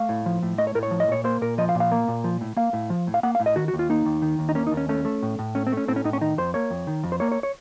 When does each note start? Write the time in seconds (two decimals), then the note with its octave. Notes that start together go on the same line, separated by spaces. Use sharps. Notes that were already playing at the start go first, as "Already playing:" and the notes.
Already playing: A3 F5
0.09 A2
0.26 F3
0.43 A2
0.58 A3 D#5
0.67 C#5
0.75 A2 A#4
0.83 C#5
0.91 F3
1.00 D#5
1.08 A#2 C#5
1.24 A#3 C5
1.41 A#2 A#4
1.58 F3 D#5
1.69 F5
1.75 A#2
1.80 F5
1.92 A#3
2.08 A#2
2.24 F3
2.41 A2
2.57 A#3 F5
2.73 A2
2.90 F3
3.07 A2
3.14 F5
3.23 A#3 F#5
3.35 F5
3.40 A2
3.46 D#5
3.56 D#3 F#4
3.68 F#4
3.74 D#2
3.79 F4
3.89 A#3 D#4
4.06 D#2
4.22 D#3
4.39 D#2
4.49 D#4
4.55 A#3 C#4
4.67 D#4
4.72 D#2
4.77 C#4
4.89 A3 C#4
5.05 A3
5.23 A2
5.39 A2
5.55 A3 C#4
5.67 C4
5.72 A3 C#4
5.88 A2 C4
5.96 C#4
6.04 A2 D#4
6.13 C#4
6.21 D#3 D#4
6.38 F2 C5
6.54 A#3 C#5
6.70 F2
6.87 D#3
7.03 F2
7.12 C5
7.20 A#3 C#5
7.32 C#5
7.43 C#5